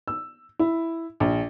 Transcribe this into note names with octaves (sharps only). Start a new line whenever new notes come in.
E6
E4
A#1